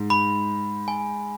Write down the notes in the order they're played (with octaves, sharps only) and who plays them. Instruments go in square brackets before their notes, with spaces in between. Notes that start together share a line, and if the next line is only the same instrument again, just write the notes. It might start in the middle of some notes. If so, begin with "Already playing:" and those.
Already playing: [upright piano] G#2
[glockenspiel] B5
G#5